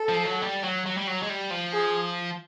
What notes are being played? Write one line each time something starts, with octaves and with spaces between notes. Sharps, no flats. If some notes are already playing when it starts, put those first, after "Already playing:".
Already playing: A4
F3
F#3
G3
F#3
F#3
G3
F#3
G#3
G3
F3
G#4